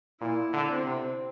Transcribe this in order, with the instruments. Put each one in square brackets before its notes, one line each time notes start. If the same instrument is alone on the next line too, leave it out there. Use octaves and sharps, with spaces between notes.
[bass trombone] A#2 [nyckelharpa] E4
[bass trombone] D3
[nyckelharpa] C4
[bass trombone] C3